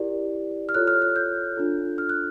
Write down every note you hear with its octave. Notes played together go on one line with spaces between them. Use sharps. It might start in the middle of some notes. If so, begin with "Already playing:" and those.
Already playing: E4 G4 A#4 D5
F6
F4 A4 C#5 F#6
F6
F6
G6
D4 F4 A4
F6
F#6